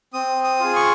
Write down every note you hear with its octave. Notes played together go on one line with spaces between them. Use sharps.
C4 D#6
D#6
F4 G#4
C#6